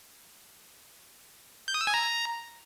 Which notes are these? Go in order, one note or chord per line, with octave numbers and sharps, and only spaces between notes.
G6
D#6
E6
G#5
A#5